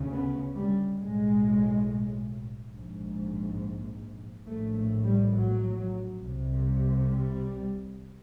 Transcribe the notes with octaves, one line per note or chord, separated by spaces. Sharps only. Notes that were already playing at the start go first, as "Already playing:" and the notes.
Already playing: D2 C#3
B3
G3
B1 A2 G#3
A#1 G#2
A#1 A2 A3
A3
G3
F#3
C2 C3
G3